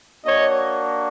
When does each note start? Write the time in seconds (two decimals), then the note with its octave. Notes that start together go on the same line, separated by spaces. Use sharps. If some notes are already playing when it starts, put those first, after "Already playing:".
0.25 A#3 D4 F#4 C#5 D#5